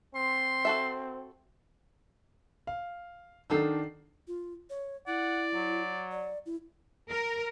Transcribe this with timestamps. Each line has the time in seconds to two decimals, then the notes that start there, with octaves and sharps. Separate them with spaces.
0.15 C4 C6
0.65 F#4 A4 E5
2.67 F5
3.50 D#3 F#3 D4 D#4 A4 C7
4.28 F4
4.70 C#5
5.07 E4 D5 F#5
5.54 F#3
6.11 D5
6.46 E4
7.10 A#4